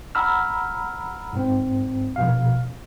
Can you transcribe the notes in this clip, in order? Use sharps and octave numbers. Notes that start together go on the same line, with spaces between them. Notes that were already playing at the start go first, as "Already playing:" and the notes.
F#5 A#5 B5 E6 F6
G#2 C4
A#1 B2 F5